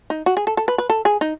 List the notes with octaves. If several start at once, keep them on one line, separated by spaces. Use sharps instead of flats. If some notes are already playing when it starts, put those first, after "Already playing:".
D#4
F#4
G#4
A4
A4
B4
B4
A4
G#4
D#4